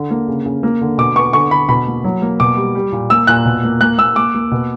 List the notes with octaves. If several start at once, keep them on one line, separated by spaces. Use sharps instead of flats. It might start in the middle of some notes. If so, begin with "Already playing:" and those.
Already playing: D3
A#3
C#3
C#3
A#3
D3
B2 D6
B3 C#6
D3 C#6
D3 B5
B2 B5
A#3
F#3
A#3
B2 D6
G3
G3
A#2
A#3 E6
A#2 F#6
B2
A#3
A#3 F#6
A#3 E6
A#3 D6
A#3
B2